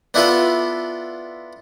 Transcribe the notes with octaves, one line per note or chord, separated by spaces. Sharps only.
B3 D4 E4 F4 A4 B4